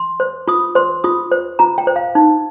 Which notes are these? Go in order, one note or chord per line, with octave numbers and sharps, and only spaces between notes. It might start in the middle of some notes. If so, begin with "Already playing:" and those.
Already playing: C6
C5
F4 D#6
C5 C6
F4 D#6
C5
F4 A#5
G5
C5
F5
D#4